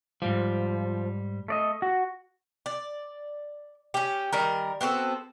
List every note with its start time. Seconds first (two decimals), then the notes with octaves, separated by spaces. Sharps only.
0.22 G#2 F3 G3
1.48 A3 D5 D#5
1.82 F#4
2.66 D5
3.94 C#4 G4
4.33 D#3 G3 A#4
4.81 B3 C4 F#4 A4